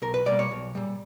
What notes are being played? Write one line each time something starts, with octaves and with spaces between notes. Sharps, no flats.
B1 A#4
B4
B2 G3 A#3 D5
C#5
B1
A#2 G3